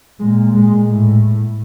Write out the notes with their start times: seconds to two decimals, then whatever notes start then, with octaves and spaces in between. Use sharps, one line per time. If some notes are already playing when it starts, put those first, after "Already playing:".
0.20 A#2 G#3
0.54 G#3
0.88 A2